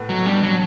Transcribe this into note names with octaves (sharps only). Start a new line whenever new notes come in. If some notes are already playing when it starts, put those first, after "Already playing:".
Already playing: A2 B3
B2 F#3
G3 D4
F#3 D4